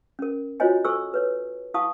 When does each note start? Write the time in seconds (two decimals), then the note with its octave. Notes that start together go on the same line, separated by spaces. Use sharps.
0.19 C#4 A#4
0.60 F4 F#4 C5 C#5 D#5 G#5
0.85 A4 C5 G#5 C6 C#6 E6
1.14 B4 C#5
1.74 E4 F5 A5 C#6 D#6